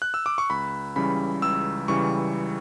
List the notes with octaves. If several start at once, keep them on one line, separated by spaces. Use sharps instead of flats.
F#6
E6
D6
C#6
C#2 B5
C#3 E3 G3 B5
C#2 E6
C#3 E3 G3 C#6